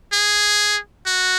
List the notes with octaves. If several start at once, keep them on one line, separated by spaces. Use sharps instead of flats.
G#4
F#4